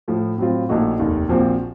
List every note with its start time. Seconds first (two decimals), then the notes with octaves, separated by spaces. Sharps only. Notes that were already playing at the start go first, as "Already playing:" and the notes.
0.08 A2 F3 A3
0.38 A2 F#3 C4 F4
0.69 A#1 A#2 A3 D#4 F#4
0.99 F1 D#2 D#3
1.29 A#1 A#2 F3 C4 F#4